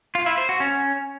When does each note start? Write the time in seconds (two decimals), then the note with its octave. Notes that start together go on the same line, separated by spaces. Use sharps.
0.15 F4
0.26 E4
0.38 C5
0.49 F#4
0.60 C#4